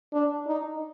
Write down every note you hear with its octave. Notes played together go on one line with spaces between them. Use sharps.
D4
D#4